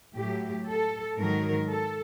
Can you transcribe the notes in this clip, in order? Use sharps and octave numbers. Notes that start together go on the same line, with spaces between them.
A2 F#3 G4
A4
G#2 D#3 F#3 A#4
A4